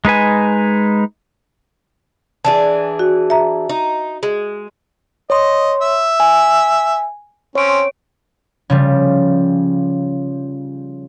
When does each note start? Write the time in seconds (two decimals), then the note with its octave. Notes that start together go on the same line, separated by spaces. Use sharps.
0.05 G#3 D#4 B4 G#5
2.45 E3 D4 G#4 A5
2.99 F#4
3.30 E5 A#5
3.70 D#4
4.23 G#3
5.30 C#5 D#5 C6
5.81 E5
6.20 G#5
7.55 C4 C#4 C#5 D7
8.70 C#3 F3 G3